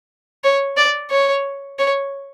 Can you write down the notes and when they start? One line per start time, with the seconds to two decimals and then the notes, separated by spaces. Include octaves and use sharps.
0.44 C#5
0.77 D5
1.11 C#5
1.79 C#5